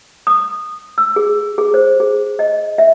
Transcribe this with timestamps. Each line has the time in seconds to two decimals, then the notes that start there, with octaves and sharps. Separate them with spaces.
0.27 D#6
0.98 E6
1.16 G#4
1.58 G#4
1.74 C5
2.00 G#4
2.39 D#5
2.78 E5